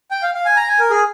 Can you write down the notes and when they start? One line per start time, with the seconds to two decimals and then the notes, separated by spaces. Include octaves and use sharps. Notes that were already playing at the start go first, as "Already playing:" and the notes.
0.11 G5
0.23 F5
0.35 F5
0.45 G#5
0.57 A#5
0.68 G#5
0.79 A#4
0.90 G#4